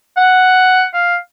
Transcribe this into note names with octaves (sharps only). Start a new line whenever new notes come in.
F#5
F5